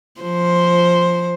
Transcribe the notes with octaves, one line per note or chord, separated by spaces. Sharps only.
F3 C5